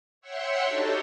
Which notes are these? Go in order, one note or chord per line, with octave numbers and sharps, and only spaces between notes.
C#5 E5 F#5 G5 C6 C#6
D4 D#4 F#4 G4 A4 C#5